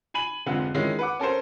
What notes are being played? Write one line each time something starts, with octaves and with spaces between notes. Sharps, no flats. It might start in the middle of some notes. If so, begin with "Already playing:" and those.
G#5 B5 D#7 F#7
F1 D3 G#3 C4 F4 F#5
D#3 G#3 C#4 E4 F4
B4 F#5 D6
C#4 A4 A#4 C5